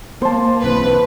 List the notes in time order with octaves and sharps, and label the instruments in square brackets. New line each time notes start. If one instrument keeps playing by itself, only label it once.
[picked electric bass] A#3 B3 [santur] C5 A5
[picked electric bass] B1 C3 E3 [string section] B4